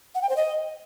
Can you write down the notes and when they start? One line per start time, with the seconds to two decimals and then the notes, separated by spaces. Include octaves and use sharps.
0.15 F#5
0.22 G5
0.29 C5
0.37 D#5